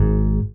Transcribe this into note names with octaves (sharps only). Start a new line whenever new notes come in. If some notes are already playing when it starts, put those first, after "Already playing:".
Already playing: G#1 G#2